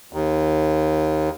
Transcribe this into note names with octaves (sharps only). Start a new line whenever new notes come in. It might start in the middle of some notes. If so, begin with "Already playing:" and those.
D#2